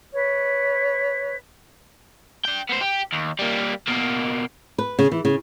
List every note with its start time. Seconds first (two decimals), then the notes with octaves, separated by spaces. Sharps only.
0.13 B4 C#5
2.45 D4 G5
2.69 B3 C5
2.81 G4
3.12 D#2
3.39 G3 A#3
3.89 B2 A#3
4.78 B4
4.99 C#3
5.12 E3
5.25 C#3